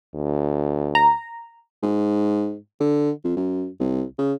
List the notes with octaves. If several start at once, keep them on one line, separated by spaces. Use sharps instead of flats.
D2
A#5
G#2
D3
F2
F#2
C2
C#3